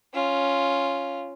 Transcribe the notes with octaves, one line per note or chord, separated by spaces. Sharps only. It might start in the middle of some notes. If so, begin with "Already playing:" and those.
C#4 F4